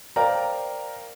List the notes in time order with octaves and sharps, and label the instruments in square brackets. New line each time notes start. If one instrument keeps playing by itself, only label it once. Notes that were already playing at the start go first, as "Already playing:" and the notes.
[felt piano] A#4 C5 D5 F5 G5 A#5